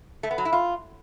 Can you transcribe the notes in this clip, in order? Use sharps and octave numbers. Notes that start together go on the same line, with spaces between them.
A3
B3
F#3
E4
F4